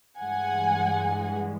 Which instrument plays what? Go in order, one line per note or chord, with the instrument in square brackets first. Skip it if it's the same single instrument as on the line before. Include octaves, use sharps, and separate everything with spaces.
[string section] G2 E3 G#3 F#5 G#5